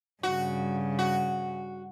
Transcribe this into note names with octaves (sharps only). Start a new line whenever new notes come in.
G2 C#3 F#4
F#4